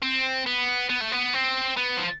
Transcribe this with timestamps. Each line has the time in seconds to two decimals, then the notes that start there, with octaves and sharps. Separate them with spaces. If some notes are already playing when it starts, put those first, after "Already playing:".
0.03 C4
0.47 B3
0.89 B3
1.00 A3
1.11 B3
1.33 C4
1.77 B3
1.97 F3